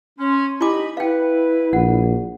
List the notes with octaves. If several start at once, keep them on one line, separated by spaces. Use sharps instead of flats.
C#4 C6
D#4 E4 G4 D#5 G#5 B5 D6
E4 B4 F5 G5
A#1 F#5